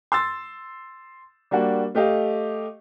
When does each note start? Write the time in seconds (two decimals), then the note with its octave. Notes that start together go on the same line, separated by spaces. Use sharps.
0.12 C6 E6 A6
1.51 G3 A#3 D4 F#4
1.95 A3 G4 D#5 F5